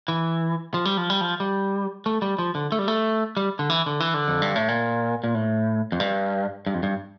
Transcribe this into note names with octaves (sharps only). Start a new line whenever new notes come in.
E3
F3
G3
F3
G3
F3
G3
A3
G3
F3
D3
A3
G3
A3
G3
D3
E3
D3
E3
D3
F2
G2
A2
A#2
A#2
A2
F2
G2
G2
F2
G2